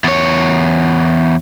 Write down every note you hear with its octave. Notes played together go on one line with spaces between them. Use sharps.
E2 C#5